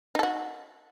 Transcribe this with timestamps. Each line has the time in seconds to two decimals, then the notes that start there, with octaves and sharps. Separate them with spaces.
0.15 D#4
0.19 A4
0.23 F#4